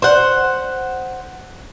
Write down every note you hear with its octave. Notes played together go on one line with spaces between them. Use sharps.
C5 F#5